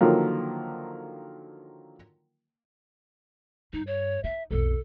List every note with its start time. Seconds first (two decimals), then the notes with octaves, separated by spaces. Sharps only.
0.01 D3 D#3 F3 F#3 A#3
3.73 G2 D#4
3.87 C#5
4.24 D#4 E5
4.51 B1 F2 A4